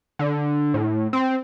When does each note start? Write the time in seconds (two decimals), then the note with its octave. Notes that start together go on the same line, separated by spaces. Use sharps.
0.19 D3
0.74 A2
1.13 C4